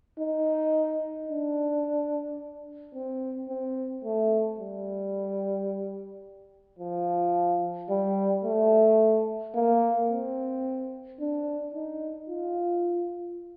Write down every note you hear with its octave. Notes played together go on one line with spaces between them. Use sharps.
D#4
D4
C4
C4
A3
G3
F3
G3
A3
A#3
C4
D4
D#4
F4